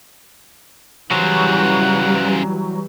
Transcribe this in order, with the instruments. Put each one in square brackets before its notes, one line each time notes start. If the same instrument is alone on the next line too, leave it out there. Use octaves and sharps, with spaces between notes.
[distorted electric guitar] C#3 C5 [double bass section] E3 G3 [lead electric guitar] F#3 [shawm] F#5